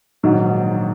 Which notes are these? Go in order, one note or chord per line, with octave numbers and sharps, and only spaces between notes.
A#1 G#2 D#3 F#3